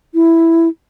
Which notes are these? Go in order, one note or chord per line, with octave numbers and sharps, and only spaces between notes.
E4